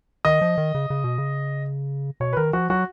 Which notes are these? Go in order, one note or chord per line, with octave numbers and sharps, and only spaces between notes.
D#3 D#5
F3
D#3
C#3
C#3
B2
C#3
B2 C#5
B4
D#3 A#4
F3 F#4
F#3 F#4